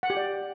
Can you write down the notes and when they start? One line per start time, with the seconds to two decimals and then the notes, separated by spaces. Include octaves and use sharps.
0.03 F#5
0.10 G4
0.17 D5